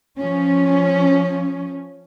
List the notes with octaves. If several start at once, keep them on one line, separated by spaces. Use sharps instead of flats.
F3 C#4